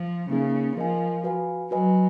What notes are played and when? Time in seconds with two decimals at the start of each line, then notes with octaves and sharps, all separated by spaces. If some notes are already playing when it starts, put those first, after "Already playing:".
Already playing: F3
0.29 C#3 A#3 D#4 G#4
0.76 F3 F4 A#4 D#5 G#5
1.24 F#4 B4 F5 G#5
1.71 F#3 F#4 B4 D#5 G#5